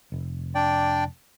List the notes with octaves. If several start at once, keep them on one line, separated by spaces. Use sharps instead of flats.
F1
D4 D5 G5